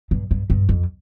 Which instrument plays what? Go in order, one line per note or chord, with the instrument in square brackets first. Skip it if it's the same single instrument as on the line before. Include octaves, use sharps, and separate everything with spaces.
[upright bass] G2
G2
G2
F2